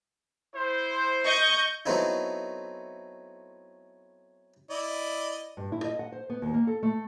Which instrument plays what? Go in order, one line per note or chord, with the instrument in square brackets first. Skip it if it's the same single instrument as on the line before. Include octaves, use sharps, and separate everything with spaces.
[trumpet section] E4 C5
[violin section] D#5 C#6 G6
[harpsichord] F#3 A3 B3 C4 D#4 E4
[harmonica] E4 D5 D#5
[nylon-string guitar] G2
E4
D#5
F#5
C5
B3
D#2
A#3
A4
A3